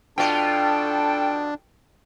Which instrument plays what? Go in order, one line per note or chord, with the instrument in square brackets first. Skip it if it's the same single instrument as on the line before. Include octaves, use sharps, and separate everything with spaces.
[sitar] B2 F4 [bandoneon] D4 [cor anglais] A4 [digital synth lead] G5